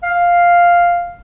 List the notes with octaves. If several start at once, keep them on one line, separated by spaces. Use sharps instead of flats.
F5